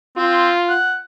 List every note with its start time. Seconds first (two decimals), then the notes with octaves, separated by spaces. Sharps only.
0.17 C4 F4
0.69 F#5